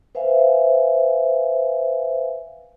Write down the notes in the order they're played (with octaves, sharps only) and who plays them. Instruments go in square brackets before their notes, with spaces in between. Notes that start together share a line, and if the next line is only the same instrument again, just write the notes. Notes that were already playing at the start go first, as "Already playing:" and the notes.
[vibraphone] B4 C5 E5 F5 G#5